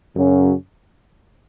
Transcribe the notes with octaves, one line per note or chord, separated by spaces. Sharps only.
F#2 C#3 F#3 C#4